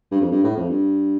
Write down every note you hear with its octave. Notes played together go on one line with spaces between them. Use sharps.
G2
F2
G2
A2
F2
G2